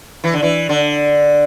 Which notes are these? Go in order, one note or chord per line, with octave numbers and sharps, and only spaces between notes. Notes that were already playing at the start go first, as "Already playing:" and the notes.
E3
D3
E3
D3